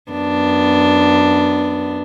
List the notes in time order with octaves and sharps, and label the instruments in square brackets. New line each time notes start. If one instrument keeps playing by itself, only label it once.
[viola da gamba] F#2 B3 D4